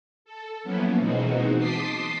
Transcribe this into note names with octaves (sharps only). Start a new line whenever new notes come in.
A4
F3 F#3 A#3 B3 C#4 E4
B2 E3 G#3 C4 D#4 F#4
A5 C6 D6 D#6 B6 C7